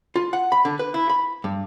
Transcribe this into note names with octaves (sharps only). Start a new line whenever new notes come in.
F4
F#5
B5
D3
B4
E4
B5
G2